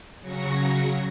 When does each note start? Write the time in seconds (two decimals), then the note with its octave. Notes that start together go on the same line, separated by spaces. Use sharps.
0.21 C#3 F#3 C#6 A#6